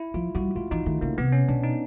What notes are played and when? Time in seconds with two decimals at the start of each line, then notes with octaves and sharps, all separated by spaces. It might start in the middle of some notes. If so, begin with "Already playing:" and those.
Already playing: E4
0.14 F3 F4
0.35 G3 F#4
0.55 G#3 F4
0.71 E3 D#4
0.86 D#3 A3
1.01 C#3 A#3
1.18 C3 B3
1.32 C#4
1.48 B2 D4
1.64 D#4